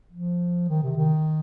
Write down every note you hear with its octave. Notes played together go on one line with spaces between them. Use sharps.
F3
D#3
C3
D#3